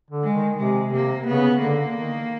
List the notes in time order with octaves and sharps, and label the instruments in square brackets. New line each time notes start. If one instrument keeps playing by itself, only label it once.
[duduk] D3
[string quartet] G#3
[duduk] D#3
[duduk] C3 [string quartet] G#3
[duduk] C3 [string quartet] A#3
[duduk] C#3 [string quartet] B3
[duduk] D3 [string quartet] A#3
[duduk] D#3